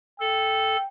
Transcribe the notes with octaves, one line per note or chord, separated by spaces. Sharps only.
A4 G5